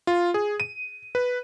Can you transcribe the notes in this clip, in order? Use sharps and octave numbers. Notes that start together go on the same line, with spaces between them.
F4
G#4
D#7
B4